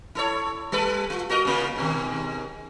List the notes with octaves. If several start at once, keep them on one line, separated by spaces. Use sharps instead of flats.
E4 A4 C#5
G3 A4 B4
F4
F#4 A#4 D#5
C#3 A#3 F4
G#2 B2 D#3